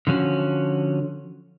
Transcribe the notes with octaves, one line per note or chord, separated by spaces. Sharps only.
D3 F3 C#4 F#4